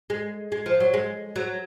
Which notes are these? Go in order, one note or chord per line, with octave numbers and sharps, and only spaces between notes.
G#3
G#3
F3
F#3
G#3
F#3